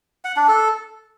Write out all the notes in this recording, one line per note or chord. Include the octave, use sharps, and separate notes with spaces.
F#5
D4
A4